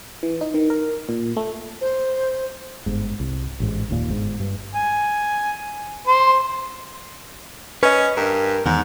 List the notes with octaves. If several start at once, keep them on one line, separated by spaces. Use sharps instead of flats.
E3
D#4
D#3
A#4
A#2
A3
C5
G1 G#2
C2
A1 G#2
F#1 D#2 A#2
G1 G#2
G2
G#5
C5
C#4 B4 D#5
G2 A#4
E2 G#2 D#3